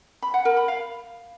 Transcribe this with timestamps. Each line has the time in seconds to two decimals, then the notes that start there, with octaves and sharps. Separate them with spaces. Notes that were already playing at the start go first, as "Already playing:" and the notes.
0.22 B5
0.34 F#5
0.45 A#4
0.57 B5
0.68 F5